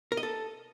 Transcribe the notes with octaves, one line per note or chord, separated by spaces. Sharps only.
A#4
D#5
A4